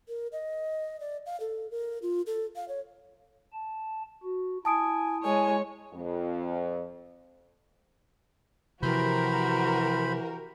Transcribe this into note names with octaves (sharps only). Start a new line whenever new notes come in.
A#4
D#5
D5
F5
A4
A#4
F4
A4
F5
C#5
A5
F#4
E4 G#5 A5 D#6 D7
G#3 C#5 G#5
F2
C3 E3 F3 F#4 G4 A#4 C5 B5